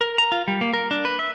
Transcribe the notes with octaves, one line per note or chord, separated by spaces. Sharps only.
A#4
A#5
F4
G3
A#3
A#4
D4
B4
E5